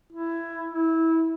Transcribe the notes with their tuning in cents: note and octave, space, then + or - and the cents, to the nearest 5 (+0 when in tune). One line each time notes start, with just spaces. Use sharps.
E4 +15
E4 -20